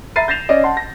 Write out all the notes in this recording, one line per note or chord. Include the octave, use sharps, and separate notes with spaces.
E5 A#5 B5 A6 C7 D#7
G6 A6 A#6 C7 E7 F7
C#4 D5 D#5
F#5 A5 C6
A#6